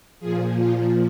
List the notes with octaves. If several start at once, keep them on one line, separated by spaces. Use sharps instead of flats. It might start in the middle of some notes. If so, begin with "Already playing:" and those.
A#2 F3 G#4
F4